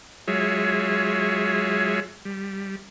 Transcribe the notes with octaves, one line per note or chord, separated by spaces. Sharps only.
F#3 G#3 F4 G#4 C#5 E5
G3